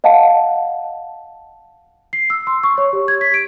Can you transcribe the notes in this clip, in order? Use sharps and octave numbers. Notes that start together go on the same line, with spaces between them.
D#5 F5 F#5 A5
C7
E6
C6
C#6
C#5
G4
G#6
B6
D7